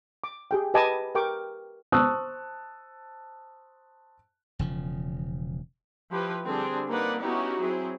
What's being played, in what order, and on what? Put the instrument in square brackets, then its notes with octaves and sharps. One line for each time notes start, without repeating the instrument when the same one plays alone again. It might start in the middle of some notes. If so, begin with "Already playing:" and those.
[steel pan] D6
G4 G#4 G5
G4 B4 D#5 G#5 A5 D6
G4 A#4 G5 C#6 D6
[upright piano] C5 A5 C#6 D#6 E6 F#6
[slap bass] E1 C#3 F3
[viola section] F3 E4 G4 B4
D3 G3 C4 D4 G#4
A#3 C4 D#4 B4 D5 F#5
B3 C#4 D#4 E4 F#4 G4
F#3 C4 E4 G#4